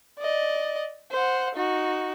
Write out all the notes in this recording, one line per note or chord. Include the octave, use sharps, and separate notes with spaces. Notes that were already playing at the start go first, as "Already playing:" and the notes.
D5 D#5
C5 F#5
D#4 F#4